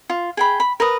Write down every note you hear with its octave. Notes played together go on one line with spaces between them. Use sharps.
F4
G#4 G5 B5
B5
A#4 B4 D#6